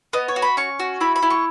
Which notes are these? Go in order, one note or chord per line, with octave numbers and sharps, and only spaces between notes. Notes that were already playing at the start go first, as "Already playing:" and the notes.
B3 D#5
C#5
F#4
B5
C#4 C#6
F#4
E4 B5
B5
E4
C#6